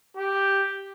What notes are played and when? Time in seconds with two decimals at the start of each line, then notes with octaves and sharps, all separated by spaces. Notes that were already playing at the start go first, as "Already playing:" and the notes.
0.17 G4